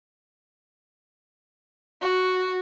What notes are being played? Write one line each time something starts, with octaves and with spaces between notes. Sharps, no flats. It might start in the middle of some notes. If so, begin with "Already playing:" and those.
F#4